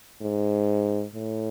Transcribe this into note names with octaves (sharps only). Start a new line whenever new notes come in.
G#2
A2